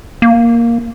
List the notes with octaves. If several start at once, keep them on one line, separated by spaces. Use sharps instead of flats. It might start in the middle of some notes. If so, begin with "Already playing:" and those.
A#3